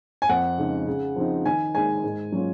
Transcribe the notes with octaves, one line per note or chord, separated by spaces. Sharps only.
G#5
F2 F#5
C#3 G#3 D#4
C#3
F3 C4 D#4
D#3 G#5
G#3 D#4 G#5
G#2
F#3 C#4 F4